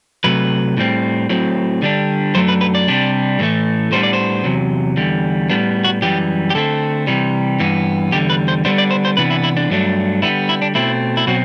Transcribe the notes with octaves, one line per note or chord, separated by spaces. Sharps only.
C3 F#3 A3 B4
A2 G3 C4
A2 F#3 C4
D3 G3 D4
F#2 F#3 A3 D4 C5
B4
B4
D5
C3 G3 D4
A2 E3 A3
A2 G3 B3 D4 C5
D5
C5
E2 C3 F#3
E2 D3 G3
A2 G3 B3 D4
F#4
F#2 E3 G3 G4
G4
D3 A3 C4 A4
C3 E3 G3
G2 E3 B3
E2 D3 G3 G4
B4
C5
D3 G3 B3 D4 C5
D5
C5
C5
C3 E3 B3 D4 B4
E4
E4
D4
G2 F#3 A3 D4
D3 G3 B3 E4
E4
D4
B2 A3 C4 E4
E4
B2 F#3 C4 F#4